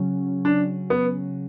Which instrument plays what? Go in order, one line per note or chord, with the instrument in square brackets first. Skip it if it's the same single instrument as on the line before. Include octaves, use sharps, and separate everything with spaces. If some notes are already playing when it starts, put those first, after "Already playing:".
Already playing: [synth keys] C#3 F#3 C#4
[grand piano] D4
B3